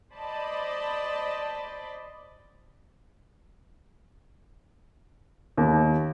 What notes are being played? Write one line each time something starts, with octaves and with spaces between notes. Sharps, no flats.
C5 D5 D#5 A5 B5
D#2